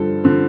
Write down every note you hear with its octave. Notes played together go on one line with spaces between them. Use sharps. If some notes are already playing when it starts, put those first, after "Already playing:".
Already playing: G2 D3 F3 A4
D3 F3